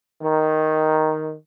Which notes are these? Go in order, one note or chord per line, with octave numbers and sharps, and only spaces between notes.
D#3